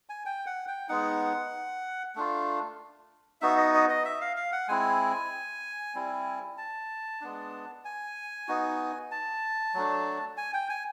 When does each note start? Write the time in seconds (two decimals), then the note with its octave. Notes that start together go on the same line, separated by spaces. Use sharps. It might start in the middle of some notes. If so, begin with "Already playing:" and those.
0.09 G#5
0.26 G5
0.46 F#5
0.68 G5
0.89 G#3 B3 D#4 F#5
2.15 A3 D4 F4
3.41 B3 D#4 F#4 E5
3.57 D#5
3.74 D#5
3.89 D#5
4.05 E5
4.21 F5
4.36 F5
4.52 F#5
4.68 G#3 C4 E4 G#5
5.95 G3 C4 E4
6.58 A5
7.21 G#3 B3 D4
7.85 G#5
8.48 B3 D#4 F#4
9.11 A5
9.74 F#3 A3 D4
10.37 G#5
10.54 G5
10.69 G#5